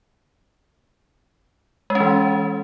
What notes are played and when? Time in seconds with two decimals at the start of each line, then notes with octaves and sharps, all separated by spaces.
1.90 G#3
1.95 C#4
2.00 E3